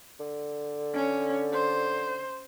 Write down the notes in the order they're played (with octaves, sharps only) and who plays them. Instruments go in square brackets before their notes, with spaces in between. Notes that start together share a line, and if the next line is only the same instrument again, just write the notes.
[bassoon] D3
[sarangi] C#4
C5